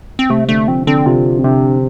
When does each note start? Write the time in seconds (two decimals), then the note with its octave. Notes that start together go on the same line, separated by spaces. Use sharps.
0.19 C4
0.30 C3 A3
0.49 D3 A3
0.68 F3 C4
0.87 D3 C4
1.06 C3 F4
1.39 C4
1.44 C3 D4